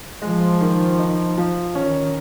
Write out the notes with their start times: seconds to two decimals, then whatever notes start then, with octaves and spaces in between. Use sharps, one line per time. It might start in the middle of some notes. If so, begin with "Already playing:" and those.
0.22 F3 G#3
0.61 D#3
0.99 D#4
1.38 F3
1.75 D#3 C#4